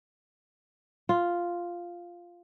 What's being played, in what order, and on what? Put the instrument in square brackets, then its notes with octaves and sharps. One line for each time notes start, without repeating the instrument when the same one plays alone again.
[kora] F4